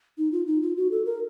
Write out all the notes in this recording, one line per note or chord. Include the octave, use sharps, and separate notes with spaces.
D#4
F4
D#4
F4
F#4
A4
A#4